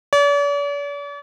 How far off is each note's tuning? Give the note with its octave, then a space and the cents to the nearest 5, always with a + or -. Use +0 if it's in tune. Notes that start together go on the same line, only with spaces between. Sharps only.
D5 -45